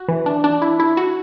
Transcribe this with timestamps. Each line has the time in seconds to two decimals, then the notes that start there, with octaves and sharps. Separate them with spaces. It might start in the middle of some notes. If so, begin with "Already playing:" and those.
Already playing: F#4
0.08 E3
0.26 D4
0.44 D4
0.62 E4
0.80 E4
0.97 F#4